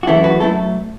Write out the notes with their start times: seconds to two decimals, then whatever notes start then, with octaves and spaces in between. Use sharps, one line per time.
0.03 F#4
0.07 F#2 C#3 E3 A3 E4 A4
0.24 F#4 B4
0.40 F#3 A3 E4 A4